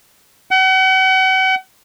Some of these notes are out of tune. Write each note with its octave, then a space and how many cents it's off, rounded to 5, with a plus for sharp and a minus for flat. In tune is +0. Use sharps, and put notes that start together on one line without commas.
F#5 +40